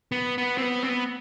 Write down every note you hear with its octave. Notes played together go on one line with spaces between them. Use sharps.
B3
B3
C4
B3
C4
B3